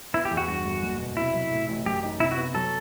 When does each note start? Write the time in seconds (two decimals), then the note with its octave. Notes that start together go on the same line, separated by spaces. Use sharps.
0.14 B3 E4
0.25 G4
0.31 E2
0.37 F#4
0.48 G2 F#4
0.65 G1
0.83 F#1
1.00 B2
1.17 C3 E4
1.34 F#3
1.51 A2
1.69 A1
1.86 F#2 G4
2.03 D#4
2.20 C3 E4
2.32 F#4
2.37 B3
2.55 F#3 A4